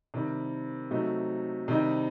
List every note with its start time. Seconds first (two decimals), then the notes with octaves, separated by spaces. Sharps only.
0.14 C3 D#3 G3
0.91 C3 F#3 A3 D#4
1.68 C3 D#3 G3 D#4